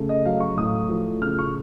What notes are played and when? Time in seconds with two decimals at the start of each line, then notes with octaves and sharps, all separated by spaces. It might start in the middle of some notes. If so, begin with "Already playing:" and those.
Already playing: C#3 A3
0.09 D#5
0.25 F#3 F5
0.40 C#6
0.57 A2 D#6
0.89 F3
1.21 C#3 F6
1.39 C#6